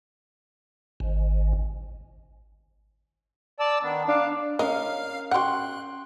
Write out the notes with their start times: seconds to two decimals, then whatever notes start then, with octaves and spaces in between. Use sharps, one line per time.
1.00 G#1
3.60 D5 A5 E6
3.83 D#3 B3 D4
4.08 D4 F5
4.59 C#4 A#4 D#5 F5 F6
5.31 F#4 F#5 G5 C6 F#6